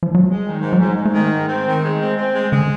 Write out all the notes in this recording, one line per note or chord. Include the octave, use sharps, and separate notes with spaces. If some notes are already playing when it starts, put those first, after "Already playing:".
F3
F#3
G3 G#3
D#3
F#3
G#2
F#3
G#2 G3
G#2
A3
D#3
G#2
C4
D#3
G#3
C4
C4
G#3
D3 G#3